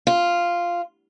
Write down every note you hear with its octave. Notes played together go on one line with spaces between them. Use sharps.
F4